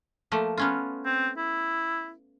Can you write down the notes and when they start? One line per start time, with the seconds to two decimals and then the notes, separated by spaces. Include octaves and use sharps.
0.32 F3 A3 A#3
0.58 B3 C#4 F4
1.06 C4
1.38 E4